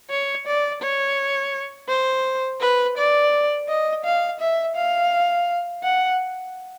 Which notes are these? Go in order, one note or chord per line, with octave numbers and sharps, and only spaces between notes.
C#5
D5
C#5
C5
B4
D5
D#5
F5
E5
F5
F#5